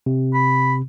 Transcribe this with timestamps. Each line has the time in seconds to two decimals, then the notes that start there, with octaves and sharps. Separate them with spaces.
0.06 C3
0.34 B5